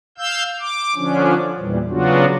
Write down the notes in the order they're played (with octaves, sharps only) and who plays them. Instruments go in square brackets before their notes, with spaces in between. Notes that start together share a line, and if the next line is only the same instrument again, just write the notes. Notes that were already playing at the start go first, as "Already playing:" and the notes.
[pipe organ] F5 E6 G6
D6
D3 F3 C#4 D4
E2 A#2 E3 G3
C#3 F#3 B3 D4 F4 F#4